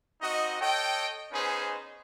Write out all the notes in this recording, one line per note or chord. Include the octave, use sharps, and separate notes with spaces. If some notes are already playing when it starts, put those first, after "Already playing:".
C4 D#4 F#4 D#5
A4 C#5 D#5 G5
B3 C#4 D#4 G#4 B4 C5